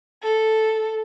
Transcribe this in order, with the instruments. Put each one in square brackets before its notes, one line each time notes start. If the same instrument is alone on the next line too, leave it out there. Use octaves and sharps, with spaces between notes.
[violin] A4